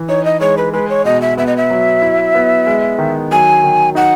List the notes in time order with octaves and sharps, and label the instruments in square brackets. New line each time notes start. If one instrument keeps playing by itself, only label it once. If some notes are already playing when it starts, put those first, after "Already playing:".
Already playing: [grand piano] E3
[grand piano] D#4 [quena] C#5
[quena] D#5
[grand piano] G#3 [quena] C#5
[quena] B4
[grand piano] G#3 [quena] B4
[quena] C#5
[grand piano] B2 [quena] D#5
[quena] E5
[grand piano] B3 [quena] E5
[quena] D#5
E5
[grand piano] F#3
E4
B3
G#3
D#3
[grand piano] F#3 [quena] G#5
[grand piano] D#3
[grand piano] D#4 [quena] F#5